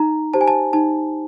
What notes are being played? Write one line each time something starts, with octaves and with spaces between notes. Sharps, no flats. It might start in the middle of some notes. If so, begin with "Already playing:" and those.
Already playing: D#4 A#5
G4 C5 A5
G#5
A5
D#4 A5